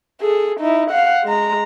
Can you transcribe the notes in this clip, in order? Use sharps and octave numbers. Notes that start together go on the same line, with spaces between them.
G#4 A4
D#4 E4
F5 F#5
G#3 A#5